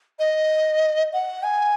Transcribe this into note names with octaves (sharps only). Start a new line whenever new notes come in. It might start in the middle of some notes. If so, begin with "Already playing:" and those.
D#5
F#5
G#5